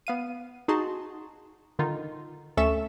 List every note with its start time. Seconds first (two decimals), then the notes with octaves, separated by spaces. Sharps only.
0.07 B3 F5 D#7
0.68 D#4 F#4 G#4 A5 C6
1.79 D3 D#3 D#4 F4
2.57 D2 C#4 A4 E5 C#6 E7